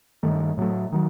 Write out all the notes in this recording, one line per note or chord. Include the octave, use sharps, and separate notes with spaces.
G2 D#3 A3
A2 F#3 A3
D#3 F#3